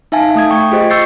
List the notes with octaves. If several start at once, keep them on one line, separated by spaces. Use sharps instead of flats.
D#4 E5 F5 G#5 A5
A3 D#6 G#6
G5 C#6
F4 G4 G#4 C5 D#5
C#6 E6 G6 A6 C7 C#7